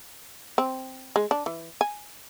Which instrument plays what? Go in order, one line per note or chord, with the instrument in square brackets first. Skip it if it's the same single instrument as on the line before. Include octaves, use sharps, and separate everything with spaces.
[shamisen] C4
G#3
D4
E3
G#5